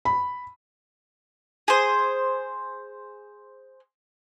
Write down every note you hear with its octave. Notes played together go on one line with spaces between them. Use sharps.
B5
G#4 C5